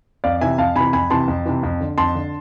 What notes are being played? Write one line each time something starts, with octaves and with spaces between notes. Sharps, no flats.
F2 D5 F5
C3 E3 E5 G#5
F2 F5 A5
C3 E3 G#5 B5
F2 G#5 B5
C3 E3 A5 C6
F2
C3 E3
F2
D3
F2 A5 C6
D3